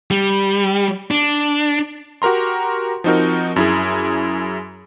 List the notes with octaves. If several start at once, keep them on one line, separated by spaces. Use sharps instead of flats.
G3
D4
F#4 G4 A#4 A#5 C6
F3 C4 D#4 F#4 A#4
F#2 E4 G#4